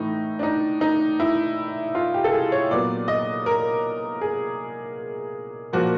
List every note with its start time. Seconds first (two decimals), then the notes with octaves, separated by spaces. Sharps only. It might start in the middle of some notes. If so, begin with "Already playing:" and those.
Already playing: A2 E3 A3 D#4
0.39 D4
0.43 D#4
0.81 D#4
1.20 E4
1.95 F4
2.14 G4
2.24 A4
2.32 G#4
2.52 C#5
2.71 A#2 F#3 B3 D5
3.08 D#5
3.46 A#4
4.21 G#4
5.73 A#2 F3 A#3 F#4